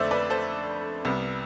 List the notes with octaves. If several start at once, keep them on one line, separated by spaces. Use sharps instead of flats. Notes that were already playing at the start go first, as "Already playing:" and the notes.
Already playing: F2 D3 A3 C5 D5 E5
B4 D5
A4 C5
C2 C3 G3 B3